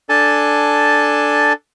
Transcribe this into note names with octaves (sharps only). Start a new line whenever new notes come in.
D4 A4 G#5 A5